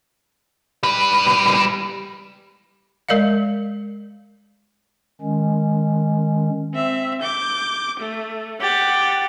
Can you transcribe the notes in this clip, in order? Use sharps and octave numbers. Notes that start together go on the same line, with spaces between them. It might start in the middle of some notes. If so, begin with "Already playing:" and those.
G3 B4
G#3 A#4 D5 D#5 F5
D#3 G#3 C#4
C4 E5
D6 G6
A3
G4 F#5 A6